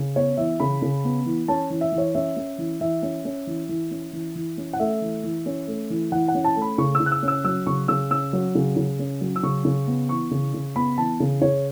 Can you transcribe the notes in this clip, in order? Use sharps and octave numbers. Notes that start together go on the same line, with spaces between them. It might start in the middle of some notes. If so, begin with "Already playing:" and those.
Already playing: C#3
B3 C#5
E3 E5
C#3 B5
C#3
B3
E3
C#4 A5
E3
E5
E3
C#5
C#4 E5
C#4
E3
E3 E5
C#4
C#4
E3
E3
C#4
E3
E3
C#4
F#5
A3 E5
E3
E3
C#4
A3
E3
E3 F#5
F#5
C#4
A5
A3
B5
C#3 C#6
E6
C#3
F#6
E6
C#4
E6
F#3 E6
C#3 C#6
C#3 E6
C#4 E6
F#3
C#3
C#3
C#4
F#3
E6
C#3 C#6
C#3
B3
E3 C#6
C#3
C#3
B3 B5
E3 A5
C#3
C#3 C#5